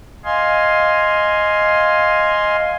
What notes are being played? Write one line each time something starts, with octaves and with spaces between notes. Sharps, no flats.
D#5 F5 G#5 C6